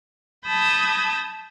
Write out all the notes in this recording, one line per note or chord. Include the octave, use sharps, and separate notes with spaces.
A5 B5 D#6 G6 G#6 A#6